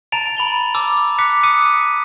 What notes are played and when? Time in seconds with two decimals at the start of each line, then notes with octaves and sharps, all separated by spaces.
0.12 A5 A#5 A6 D7 F7
0.37 B5 F7 G7
0.75 A5 D6 E6
1.18 D6 F#6 B6 C#7
1.43 D6 D#6 F#6 B6 C#7 D#7